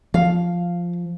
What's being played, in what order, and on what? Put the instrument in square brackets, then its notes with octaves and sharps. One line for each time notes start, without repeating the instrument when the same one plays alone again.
[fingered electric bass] F3 [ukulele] F5